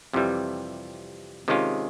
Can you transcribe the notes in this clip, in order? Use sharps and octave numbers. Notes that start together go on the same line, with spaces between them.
F2 C3 E3 G3
C3 D#3 G#3 C#4 F4